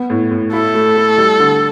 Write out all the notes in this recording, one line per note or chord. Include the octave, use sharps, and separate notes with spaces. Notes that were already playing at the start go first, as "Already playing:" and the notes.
Already playing: B3
A2
A2
E4 A4
A3
A3
G3
D3